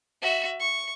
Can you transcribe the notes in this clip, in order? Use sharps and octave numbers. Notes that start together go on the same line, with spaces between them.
F#4 E5
C#6